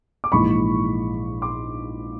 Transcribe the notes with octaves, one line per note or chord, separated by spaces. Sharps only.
D6
A#1 G#2 E3 B5 C#6
C6 D6